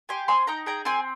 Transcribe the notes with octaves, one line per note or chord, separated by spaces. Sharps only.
G4 G#5 C6
C4 G#5 C6
D#4 G5 A#5
G#4 G5 A#5
C4 G#5 C6